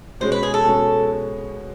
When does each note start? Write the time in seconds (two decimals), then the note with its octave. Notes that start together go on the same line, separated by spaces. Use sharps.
0.20 B2 G#3 C#4 C5
0.32 B4
0.43 G#4
0.54 A4
0.65 B2 G#3 C#4